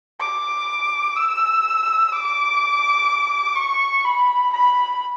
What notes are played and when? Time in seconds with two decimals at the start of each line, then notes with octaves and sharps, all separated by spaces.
0.20 D6
1.16 E6
2.12 D6
3.56 C#6
4.05 B5
4.52 B5